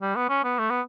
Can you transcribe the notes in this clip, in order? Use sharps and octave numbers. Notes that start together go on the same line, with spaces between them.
G3
B3
C#4
B3
A3
B3